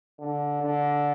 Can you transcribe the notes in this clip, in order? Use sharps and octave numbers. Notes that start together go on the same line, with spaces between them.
D3
D3